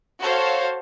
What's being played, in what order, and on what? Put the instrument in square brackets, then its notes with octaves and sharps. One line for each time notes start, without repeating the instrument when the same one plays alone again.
[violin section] F#4 A4 C5 C#5 F5